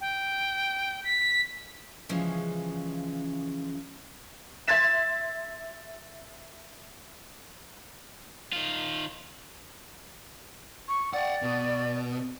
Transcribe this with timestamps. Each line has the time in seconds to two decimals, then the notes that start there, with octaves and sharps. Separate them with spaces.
0.01 G5
1.04 B6
2.09 C#3 E3 F3 G#3 C#4
4.68 E5 C6 G#6 A6 B6 E7
8.53 D#3 F4
10.88 C#6
11.13 D5 F#5 G5
11.42 B2